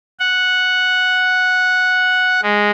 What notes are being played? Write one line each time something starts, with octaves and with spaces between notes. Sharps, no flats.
F#5
G#3